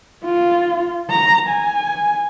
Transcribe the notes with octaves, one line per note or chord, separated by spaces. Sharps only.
F4
A#5
G#5